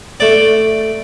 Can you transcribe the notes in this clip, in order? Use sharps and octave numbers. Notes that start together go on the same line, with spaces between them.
A3 D5